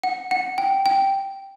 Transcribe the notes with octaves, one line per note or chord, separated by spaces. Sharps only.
F#5
F#5
G5
G5